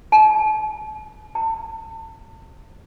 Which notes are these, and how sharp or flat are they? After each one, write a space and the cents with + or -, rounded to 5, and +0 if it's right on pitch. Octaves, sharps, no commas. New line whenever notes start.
A5 -40
A5 +35